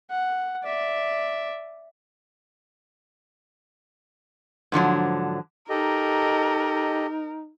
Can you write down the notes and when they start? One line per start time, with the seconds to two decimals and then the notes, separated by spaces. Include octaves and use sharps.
0.10 F#5
0.64 D5 E5
4.72 G#2 D3 F3 F#3
5.69 D#4 G4 A4 A#4 D#5